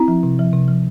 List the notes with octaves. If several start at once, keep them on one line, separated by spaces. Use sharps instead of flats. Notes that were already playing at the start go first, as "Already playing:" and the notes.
Already playing: C4 E4
F3
C3
F3
C3
F3